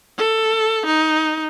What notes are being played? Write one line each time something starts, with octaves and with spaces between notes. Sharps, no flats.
A4
D#4